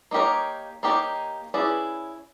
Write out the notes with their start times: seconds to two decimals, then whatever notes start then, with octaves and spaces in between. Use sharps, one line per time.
0.11 A#3 D#4 G4 A#4 C#5
0.83 A#3 D#4 G4 A#4 C#5
1.54 C#4 E4 G#4 B4 D5